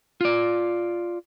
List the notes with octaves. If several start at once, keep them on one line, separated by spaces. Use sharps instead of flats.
F4 D5